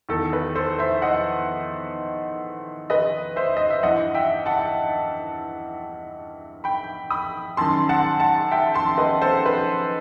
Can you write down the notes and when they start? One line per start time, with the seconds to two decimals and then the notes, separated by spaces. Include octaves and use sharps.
0.09 E2 D#3 A4
0.33 B4
0.55 A4 C5
0.79 C5 E5
1.02 D#5 F#5
2.90 B4 D#5
3.36 C5 E5
3.57 D#5
3.70 E5
3.83 G2 E3 D#5 F#5
4.14 E5 G5
4.46 F#5 A5
6.64 G5 B5
7.11 B5 D#6
7.57 F#2 D#3 A5 C6
7.89 F#5 A5
8.20 F#5 A5
8.51 E5 G5
8.74 A5 C6
8.98 B4 D#5
9.22 A4 C5
9.46 B4